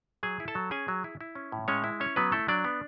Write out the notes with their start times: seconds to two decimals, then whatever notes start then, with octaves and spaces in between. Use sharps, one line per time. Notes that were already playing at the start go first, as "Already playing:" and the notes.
0.23 F#3 G#4 G#5
0.40 E4
0.48 A4 A5
0.55 F#3
0.71 C#4 G#4 G#5
0.88 F#3
1.04 E4
1.21 E4
1.35 C#4
1.52 A2
1.68 G#3 C#4 C#5
1.84 E4
2.00 C#4 C#5
2.16 F#3 B3 B4
2.32 A3 E4 A4
2.48 F#3 D4 D5
2.65 B3